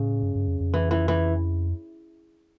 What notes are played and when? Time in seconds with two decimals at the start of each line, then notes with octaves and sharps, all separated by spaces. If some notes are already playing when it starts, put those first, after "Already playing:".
Already playing: A2 C#3
0.22 G2
0.35 G2
0.48 F2
0.61 F2
0.74 E3
0.91 E3
1.08 E3